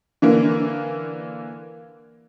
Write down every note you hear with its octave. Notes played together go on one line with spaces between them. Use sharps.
D3 E3 A#3